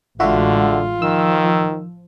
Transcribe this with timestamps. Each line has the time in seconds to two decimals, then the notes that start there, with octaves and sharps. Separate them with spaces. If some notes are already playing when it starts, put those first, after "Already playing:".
0.20 A1 D3 G#3 F4 F#4 E5
1.02 D#3 F3 E6